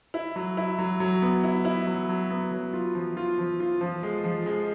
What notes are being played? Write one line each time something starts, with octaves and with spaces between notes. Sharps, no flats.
E4
F#3
E4
F#3
F#3
B3
E4
E4
F#3
F#3
B3
F#3
F4
F3
F4
F3
F4
F3
G#3
F3
G#3